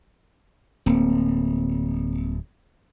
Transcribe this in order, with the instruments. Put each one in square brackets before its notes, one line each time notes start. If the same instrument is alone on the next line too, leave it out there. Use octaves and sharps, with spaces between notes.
[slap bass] D1 [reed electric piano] A#3 C4